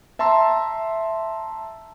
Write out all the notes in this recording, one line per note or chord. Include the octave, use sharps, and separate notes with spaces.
E5 A5 A#5 C6 E6